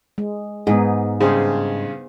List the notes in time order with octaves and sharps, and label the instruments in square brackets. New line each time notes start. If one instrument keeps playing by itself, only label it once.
[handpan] G#3
[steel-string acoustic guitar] G#2 [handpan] B3 D#4 G#4
[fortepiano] G2 C#3 [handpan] G#4 C5